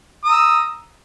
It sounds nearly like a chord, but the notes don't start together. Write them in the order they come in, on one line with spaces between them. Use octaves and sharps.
D#6 A#5 E6